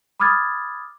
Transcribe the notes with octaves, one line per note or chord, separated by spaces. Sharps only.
B5 D6 D#6 F6 G#6 A6